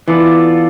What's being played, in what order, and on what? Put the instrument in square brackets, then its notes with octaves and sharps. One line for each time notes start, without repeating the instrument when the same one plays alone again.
[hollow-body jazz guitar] E3 [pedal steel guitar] B3 F4 A4 D5